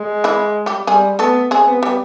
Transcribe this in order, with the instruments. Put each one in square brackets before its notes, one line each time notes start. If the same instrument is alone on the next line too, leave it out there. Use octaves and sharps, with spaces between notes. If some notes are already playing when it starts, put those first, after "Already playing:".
Already playing: [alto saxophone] G#3
[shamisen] E3 E4
G3 G4
[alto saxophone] G3 [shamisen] G#3 G#4
[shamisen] A3 A4 [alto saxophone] B3
[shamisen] G#3 G#4 [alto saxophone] C4
[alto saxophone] B3
[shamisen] G3 G4 [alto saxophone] B3